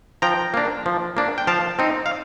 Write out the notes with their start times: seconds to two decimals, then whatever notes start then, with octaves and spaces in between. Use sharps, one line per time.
0.22 F3 G5 A#5
0.54 A#3 D4
0.86 F3
1.17 A#3 D4
1.38 G5
1.47 F3 F5 A5
1.79 C4 D#4
2.06 F5